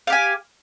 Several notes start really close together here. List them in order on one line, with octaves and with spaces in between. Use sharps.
F5 G4 G#5